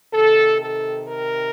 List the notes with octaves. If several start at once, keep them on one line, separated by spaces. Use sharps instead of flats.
C3 D#3 A4
A4
A#4